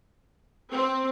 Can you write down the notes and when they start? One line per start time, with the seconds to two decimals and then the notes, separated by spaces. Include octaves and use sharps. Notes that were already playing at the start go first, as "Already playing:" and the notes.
0.72 C4